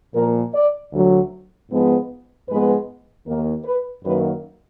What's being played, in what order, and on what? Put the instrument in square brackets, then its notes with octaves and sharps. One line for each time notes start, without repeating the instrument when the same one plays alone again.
[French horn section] A#2 F3 A#3 A#4
D5
D2 D3 F#3
G#2 F3 G#3 B3
G#2 F3 G#3 B3 B4
D#2 D#3 A#3 A#4
B4
F#2 D#3 F#3 A#3 B4